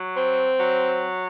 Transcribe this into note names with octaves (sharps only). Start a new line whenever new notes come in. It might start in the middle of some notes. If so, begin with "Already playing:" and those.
Already playing: F#3
C4
F#3